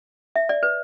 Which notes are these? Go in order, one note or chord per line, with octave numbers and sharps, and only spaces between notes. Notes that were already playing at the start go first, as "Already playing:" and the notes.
E5
D5
B4